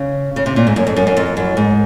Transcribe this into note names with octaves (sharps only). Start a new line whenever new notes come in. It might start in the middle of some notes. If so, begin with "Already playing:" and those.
Already playing: C#3
C#3
C3
A#2
G#2
F#2
F2
F#2
F#2
F2
F#2
G#2